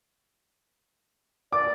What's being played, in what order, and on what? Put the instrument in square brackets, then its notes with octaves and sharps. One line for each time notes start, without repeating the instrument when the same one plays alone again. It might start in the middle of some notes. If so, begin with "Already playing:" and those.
[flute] D5 [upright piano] D6